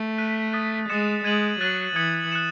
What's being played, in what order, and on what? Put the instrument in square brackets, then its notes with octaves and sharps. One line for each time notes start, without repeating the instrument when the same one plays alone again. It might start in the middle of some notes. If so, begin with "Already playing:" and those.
Already playing: [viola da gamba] A3
[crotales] F#6 B6 D#7
D#6 F#6 A6
[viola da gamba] G#3 [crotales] D#6 A6 C#7 E7
[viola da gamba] G#3 [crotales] G#6 D#7 F#7
[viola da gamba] F#3 [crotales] F#6 A6 D#7 F#7
[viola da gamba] E3 [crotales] D#6 G#6 C#7 F#7
[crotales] F#6 C#7 E7